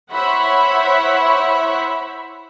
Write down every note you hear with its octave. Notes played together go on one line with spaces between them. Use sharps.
E4 C5 C#5 E5 F#5 B5